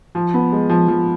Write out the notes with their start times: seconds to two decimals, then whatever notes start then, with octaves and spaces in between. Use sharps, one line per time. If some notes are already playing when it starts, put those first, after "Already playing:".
0.15 F3
0.34 B3
0.52 G#3
0.69 F3
0.88 F3